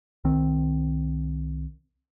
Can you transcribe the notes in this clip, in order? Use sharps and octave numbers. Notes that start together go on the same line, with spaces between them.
C2 D#3 C4